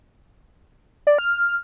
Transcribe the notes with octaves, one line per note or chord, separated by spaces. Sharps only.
D5
F6